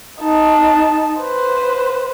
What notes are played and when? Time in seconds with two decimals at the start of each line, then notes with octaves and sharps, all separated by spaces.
0.21 D#4 A5
1.21 B4 C5